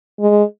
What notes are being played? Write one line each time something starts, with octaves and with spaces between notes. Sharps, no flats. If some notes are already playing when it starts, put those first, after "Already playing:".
G#3